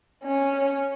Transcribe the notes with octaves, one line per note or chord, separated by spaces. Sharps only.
C#4